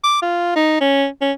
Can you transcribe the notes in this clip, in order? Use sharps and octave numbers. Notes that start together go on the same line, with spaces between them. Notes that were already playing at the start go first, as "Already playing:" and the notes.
D6
F4
D#4
C#4
C#4